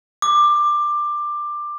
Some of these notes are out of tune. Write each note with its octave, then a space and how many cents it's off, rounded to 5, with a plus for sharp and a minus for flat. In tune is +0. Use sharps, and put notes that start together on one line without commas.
D6 +15